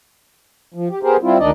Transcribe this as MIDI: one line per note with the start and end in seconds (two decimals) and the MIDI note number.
0.74 0.88 53
0.90 0.99 67
1.03 1.17 59
1.03 1.17 67
1.03 1.17 68
1.03 1.17 70
1.03 1.17 72
1.22 1.38 55
1.22 1.38 60
1.22 1.38 64
1.22 1.38 65
1.39 1.51 38
1.39 1.51 51
1.39 1.51 62
1.39 1.51 63
1.39 1.51 74
1.39 1.51 75